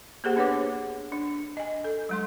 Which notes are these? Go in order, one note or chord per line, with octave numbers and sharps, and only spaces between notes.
A#3 G4 G#4 A#4 C5 F#5
B3 D4 B4 C#5 F#5 D6
D4
D#5 G#5
A4
F#3 G#3 C6